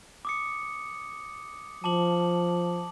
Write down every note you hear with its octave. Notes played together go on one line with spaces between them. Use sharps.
D6 D#6 C#7
F3 A5 D6 F#7